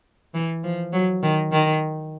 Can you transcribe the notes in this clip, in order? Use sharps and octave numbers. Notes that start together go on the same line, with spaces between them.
E3
F3
F#3
D#3
D#3